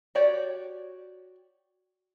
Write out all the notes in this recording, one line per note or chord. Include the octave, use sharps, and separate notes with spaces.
F#4 G4 C#5 D5